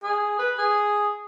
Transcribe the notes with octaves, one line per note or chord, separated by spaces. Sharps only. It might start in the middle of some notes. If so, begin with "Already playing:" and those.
G#4
B4
G#4